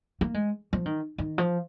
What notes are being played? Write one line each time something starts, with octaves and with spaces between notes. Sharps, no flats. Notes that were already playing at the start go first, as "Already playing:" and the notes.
A#3
G#3
F3
D#3
D#3
F3